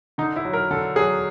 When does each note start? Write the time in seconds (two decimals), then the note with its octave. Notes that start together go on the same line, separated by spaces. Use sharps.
0.18 D3 D#4
0.36 E4
0.45 F#3
0.53 A#4
0.71 D3 A4
0.96 F#3 G#4